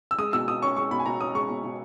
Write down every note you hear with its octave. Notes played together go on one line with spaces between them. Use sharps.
E6
G#3 D#6
B2 E6
B2 D#6
C#4 C#6
G#3 C#6
B2 B5
G#5
B2 A#5
C#4 D#6
G#3 C#6
B2
B2